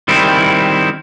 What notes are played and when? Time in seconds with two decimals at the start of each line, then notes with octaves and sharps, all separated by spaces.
0.08 D#3 G3 C4 E4